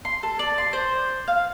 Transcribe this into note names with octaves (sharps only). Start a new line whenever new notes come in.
C6
A4
D5
C6
C5
F5